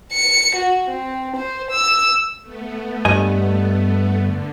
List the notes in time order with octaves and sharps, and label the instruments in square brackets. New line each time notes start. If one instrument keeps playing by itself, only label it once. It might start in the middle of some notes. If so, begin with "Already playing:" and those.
[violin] C#7
F#4
C4
C5
E6
[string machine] A3 B3
[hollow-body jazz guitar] G2 D#5 G#5
[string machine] D3